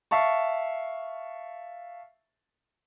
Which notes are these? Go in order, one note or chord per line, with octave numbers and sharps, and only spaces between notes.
E5 F5 A5 C#6